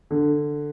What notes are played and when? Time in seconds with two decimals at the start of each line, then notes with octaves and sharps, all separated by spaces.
0.11 D3